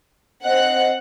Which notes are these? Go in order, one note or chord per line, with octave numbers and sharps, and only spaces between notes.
C4 D#5 F#5 F#6